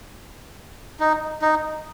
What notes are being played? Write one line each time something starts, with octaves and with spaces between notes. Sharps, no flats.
D#4
D#4